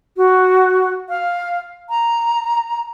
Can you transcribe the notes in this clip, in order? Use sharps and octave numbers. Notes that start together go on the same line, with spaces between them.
F#4
F5
A#5